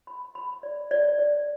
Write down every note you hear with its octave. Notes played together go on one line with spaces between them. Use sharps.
B5
B5
D5
D5
D5